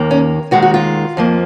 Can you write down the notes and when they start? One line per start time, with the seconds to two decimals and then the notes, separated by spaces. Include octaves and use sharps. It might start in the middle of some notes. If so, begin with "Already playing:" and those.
Already playing: D#2 D#3 A#3
0.11 C#4
0.51 D#2 D#3 G#3 F#4
0.62 F#4
0.74 F4
1.17 F2 F3 A#3